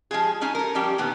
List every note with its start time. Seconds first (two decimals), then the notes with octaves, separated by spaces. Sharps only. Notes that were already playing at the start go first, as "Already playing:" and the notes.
0.11 F3 G#3 F4 G#4
0.41 G#3 C#4 D#4 G#5
0.55 A4 A#4
0.75 F3 G3 C#4 G4 G5
0.98 A#2 D3 D#3 B3